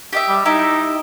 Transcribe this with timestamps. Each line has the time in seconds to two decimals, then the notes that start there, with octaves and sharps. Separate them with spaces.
0.13 G4 D#5 E5
0.29 G3
0.45 D#4 E4 G4 E5